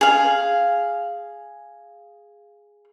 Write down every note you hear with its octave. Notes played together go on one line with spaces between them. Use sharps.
G#4 F5